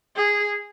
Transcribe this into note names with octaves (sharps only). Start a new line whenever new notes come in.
G#4